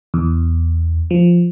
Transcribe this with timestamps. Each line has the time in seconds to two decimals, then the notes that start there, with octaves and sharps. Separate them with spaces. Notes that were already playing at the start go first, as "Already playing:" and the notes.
0.14 E2
1.11 F3